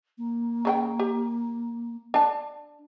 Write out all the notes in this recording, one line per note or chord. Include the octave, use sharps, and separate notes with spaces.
A#3
C#3 D#4 G5
G4
D4 A5